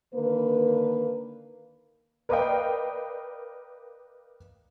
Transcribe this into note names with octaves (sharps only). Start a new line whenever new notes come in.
D3 D#3 A#3 B4
A#4 B4 D5 D#5 F5 G5